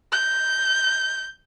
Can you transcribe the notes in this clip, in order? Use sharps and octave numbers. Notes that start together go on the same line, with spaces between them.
G6